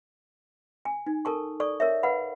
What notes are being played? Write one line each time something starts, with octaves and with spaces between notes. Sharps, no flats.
G#5
D#4
A4 A#4 A5 C#6
A4 D5 C#6
A#4 C#5 E5
B4 F5 F#5 B5